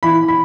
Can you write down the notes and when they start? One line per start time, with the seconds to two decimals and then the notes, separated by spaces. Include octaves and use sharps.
0.03 E3 B5
0.28 B5